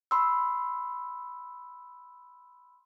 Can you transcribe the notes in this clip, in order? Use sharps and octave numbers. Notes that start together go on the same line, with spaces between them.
B5 C6 E6